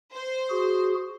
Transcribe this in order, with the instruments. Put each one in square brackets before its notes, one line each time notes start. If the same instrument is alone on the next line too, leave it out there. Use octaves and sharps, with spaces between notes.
[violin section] C5
[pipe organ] F#4 G#4